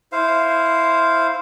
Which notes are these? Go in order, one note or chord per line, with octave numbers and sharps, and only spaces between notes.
E4 C5 F5